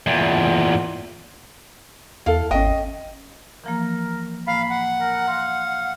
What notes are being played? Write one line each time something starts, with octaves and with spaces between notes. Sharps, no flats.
E2 A#2
E2 E4 A4 F5
G#1 C#4 D#5 G5
E3 F3 A#3 A#4
A2 A#3 F5 B5
F#5
A#4
F5 C6